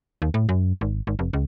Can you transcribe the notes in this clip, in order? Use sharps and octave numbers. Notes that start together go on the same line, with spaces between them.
D#2
A2
F#2
G#1
G#1
F1
C#2